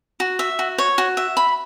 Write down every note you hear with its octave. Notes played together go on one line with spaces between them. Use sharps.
F#4
E5
F#4
C#5
F#4
E5
B5